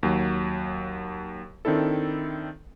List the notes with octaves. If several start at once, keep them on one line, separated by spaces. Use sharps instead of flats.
D#2 F#3
D#3 C4 D4 E4 A4